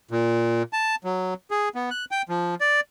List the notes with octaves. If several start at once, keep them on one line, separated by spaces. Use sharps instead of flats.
A#2
A5
F#3
G#4
B3
F#6
G5
F3
D5